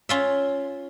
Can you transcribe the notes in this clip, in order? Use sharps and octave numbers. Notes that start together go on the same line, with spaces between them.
C#4 F4 E5